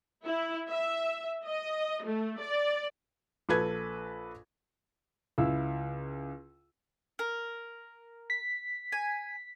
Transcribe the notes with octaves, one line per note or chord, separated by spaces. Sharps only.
E4
E5
D#5
A3
D5
A#1 A4 B4 G#6
C#2 E4 F5 E6
A#4
B6
G#5